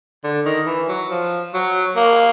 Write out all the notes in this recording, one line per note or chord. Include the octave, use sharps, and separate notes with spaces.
D3
D#3
E3
F#3
F3
F#3
A#3